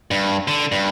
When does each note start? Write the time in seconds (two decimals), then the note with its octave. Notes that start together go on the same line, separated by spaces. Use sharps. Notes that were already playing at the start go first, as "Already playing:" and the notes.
0.11 G2
0.48 D3
0.72 G2